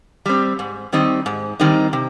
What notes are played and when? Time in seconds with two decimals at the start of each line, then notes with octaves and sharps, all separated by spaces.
0.26 G3 C4
0.59 G#2
0.93 D#3 G3 C4 D#4
1.26 G#2
1.60 D#3 G3 C4 D#4
1.93 C3